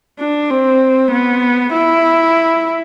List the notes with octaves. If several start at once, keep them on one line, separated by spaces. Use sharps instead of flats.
D4
C4
B3
E4